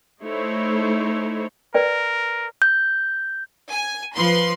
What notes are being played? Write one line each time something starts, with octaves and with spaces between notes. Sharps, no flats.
A3 D#4 E4 C5 C#5
A#4 B4 D5 G5
G6
G#5
F3 B4 C6